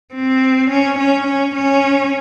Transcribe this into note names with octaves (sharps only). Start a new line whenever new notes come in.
C4
C#4
C#4
C#4
C#4